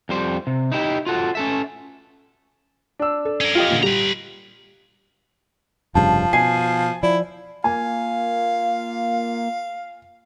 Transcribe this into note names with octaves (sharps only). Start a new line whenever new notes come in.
F2 G3 C5
C3
D#4 E4 G4
F4 F#4 A4
C#4 A4 E5
D4 E6
A4
C#4 A#4
F4 G4 D#5
A#2 D3
G3 G4 B4 A#5 F7
F1 G2 C#3 F3 A5
B2 G#5 C7
F3 E4 D5
A#3 F4 F5 G#5